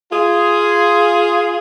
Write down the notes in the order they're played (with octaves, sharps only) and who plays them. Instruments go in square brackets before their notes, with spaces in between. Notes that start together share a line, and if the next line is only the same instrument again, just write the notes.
[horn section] F4 G#4